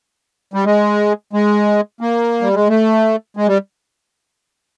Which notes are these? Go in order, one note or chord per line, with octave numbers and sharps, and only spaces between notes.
G3
G#3
G#3
A#3
G3
G#3
A3
G#3
G3